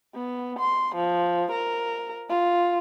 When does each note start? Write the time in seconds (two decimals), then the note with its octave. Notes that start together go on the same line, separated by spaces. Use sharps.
0.15 B3
0.59 C6
0.95 F3
1.52 A#4
2.29 F4